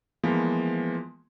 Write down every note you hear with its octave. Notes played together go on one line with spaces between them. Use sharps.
E3 F3 G#3 A#3 B3